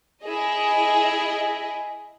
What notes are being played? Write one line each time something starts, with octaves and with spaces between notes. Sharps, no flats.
E4 G#4 D#5